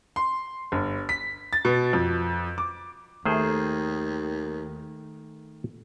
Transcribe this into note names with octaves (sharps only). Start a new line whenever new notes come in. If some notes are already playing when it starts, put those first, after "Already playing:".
C6
G1
B6
A6
B2
F2
D6
D#2 D#3 A3 G#4 C5